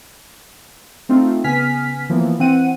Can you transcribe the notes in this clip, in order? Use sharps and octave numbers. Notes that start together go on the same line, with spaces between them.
A3 C4 D#4 F4
C#3 B3 G#5 F6 B6
E3 F3 A#3 B3
E3 C4 F#5 D#7